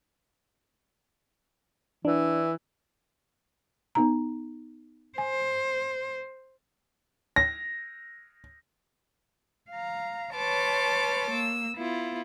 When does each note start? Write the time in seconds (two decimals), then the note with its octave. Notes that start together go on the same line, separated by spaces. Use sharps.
2.05 E3 D4
3.95 B3 D#4 A#5
5.18 C5 G#5
7.36 A#6
9.72 F5 A#5
10.36 B4 C#5 A5 C6 D6 F6
11.31 A#3 E6
11.76 B3 E4 F4